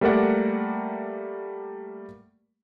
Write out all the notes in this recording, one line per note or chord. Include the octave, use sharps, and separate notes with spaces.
G3 A3 A#3 A#4 D5 F#5